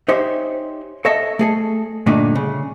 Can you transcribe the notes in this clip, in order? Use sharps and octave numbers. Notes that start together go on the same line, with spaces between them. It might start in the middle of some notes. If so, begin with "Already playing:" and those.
D#4 G4 G#4 C5 C#5 E5
A4 C#5 D#5 E5 A5
A3 G#4 A4
G2 A#2 D3 A3 D4 D#4
C#3